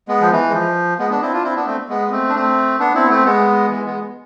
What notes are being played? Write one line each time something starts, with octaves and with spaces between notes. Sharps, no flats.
G#3 B3
F3
E3
G#3
F3
G#3 B3
B3 D4
C4 E4
D4 F4
C4 E4
B3 D4
A3 C4
G#3 B3
A3 C4
D4
A3 C4
B3 D4
C4 E4
B3
A3 C4
G#3 B3
E3 G#3
G#3 B3